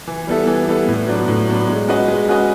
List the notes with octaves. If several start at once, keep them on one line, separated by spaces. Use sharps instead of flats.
E3
G3 B3 E4 A4
E3
G3 B3 E4 A4
A2
F#3 B3 D4
A2
F#3 B3 D4
G#3
C#4 F#4 B4 D#5
G#3
C#4 F#4 B4 D#5